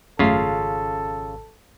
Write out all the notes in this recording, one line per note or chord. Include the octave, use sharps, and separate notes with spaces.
G#1 F#2 C#3 A3 F4 A4 C7